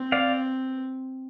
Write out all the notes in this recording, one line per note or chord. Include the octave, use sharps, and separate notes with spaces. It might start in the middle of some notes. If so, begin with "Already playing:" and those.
Already playing: C4
D5 F5